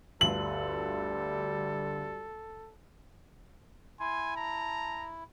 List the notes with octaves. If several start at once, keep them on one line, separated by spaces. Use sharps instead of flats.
G1 D2 G3 A4 F#7
E4 G#5 C6
A5 A#5